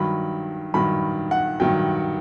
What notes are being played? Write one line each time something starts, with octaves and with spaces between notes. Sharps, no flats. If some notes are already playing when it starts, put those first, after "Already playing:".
Already playing: G2 D#3 F#3 B5
G2 D#3 F#3 B5
F#5
G2 D#3 F#3 G5